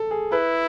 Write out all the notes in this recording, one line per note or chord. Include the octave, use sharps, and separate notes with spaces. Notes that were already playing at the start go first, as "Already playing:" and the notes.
Already playing: A4
G#4
E4 B4